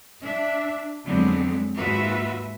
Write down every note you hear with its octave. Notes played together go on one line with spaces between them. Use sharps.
D4 E5
F2 D3 F#3 G#3 B3 C4
D#2 G#2 F4 F#4 B4 E5